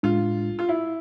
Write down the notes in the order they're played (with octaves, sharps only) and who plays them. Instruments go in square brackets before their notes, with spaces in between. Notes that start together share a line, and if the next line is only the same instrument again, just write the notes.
[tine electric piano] A2 G#3 D4 [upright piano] F4
[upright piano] F4
E4